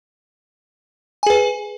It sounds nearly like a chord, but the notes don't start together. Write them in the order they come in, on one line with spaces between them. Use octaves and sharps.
G#5 G#4 B4